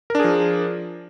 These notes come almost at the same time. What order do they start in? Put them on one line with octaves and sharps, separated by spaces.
A#4 D4 G#4 F3